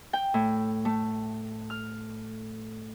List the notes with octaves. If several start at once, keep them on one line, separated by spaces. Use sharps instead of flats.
G5
A2
A3
F6